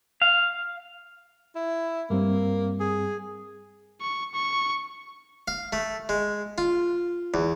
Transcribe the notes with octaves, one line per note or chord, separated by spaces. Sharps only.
F5
E4
G2 G3 A#3 C4
G#4
C#6
C#6
F5
A3
G#3
F4
E2